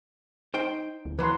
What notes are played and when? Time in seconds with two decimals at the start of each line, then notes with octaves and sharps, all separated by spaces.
0.54 D#4 C5 G5
1.05 D2
1.19 E3 F#3 B4 C6